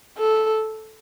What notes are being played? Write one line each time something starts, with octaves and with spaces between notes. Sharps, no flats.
A4